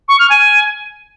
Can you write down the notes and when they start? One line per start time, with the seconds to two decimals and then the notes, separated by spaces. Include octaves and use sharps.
0.08 C#6
0.19 F6
0.30 G#5